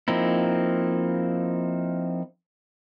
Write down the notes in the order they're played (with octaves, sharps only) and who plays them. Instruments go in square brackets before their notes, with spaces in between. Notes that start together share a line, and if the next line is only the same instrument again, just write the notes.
[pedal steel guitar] F3 A#3 C4 D#4 E4